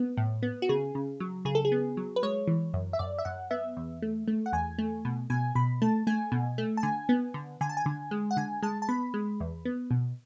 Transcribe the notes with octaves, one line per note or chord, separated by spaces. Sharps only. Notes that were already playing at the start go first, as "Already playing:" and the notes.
Already playing: B3
A2
B3
F#4
C#3 G#4
C#3
F#3
C#3 G#4
A4
G#4
B3
F#3
B4
G#3 C#5
E3
F#2
E5
F#2 D5
E5
F#2 F#5
B3 E5
E2
A3
A3
F#5
E2 G#5
A3
B2
B2 G#5
B2 B5
A3 A5
A3 G#5
B2
A3
A5
D3 G#5
B3
D3
D3 G#5
A5
G#5
D3
G#3
F#5
D3 G#5
G#3 A5
A5
B3 B5
G#3
E2
B3
B2